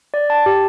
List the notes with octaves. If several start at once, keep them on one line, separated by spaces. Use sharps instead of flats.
D5
A5
G4